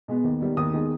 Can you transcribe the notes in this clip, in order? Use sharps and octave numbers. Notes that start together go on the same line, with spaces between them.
B2 G#3 B3
D#2
D#3 G3 B3
D#2 D#6
D#3 G#3 B3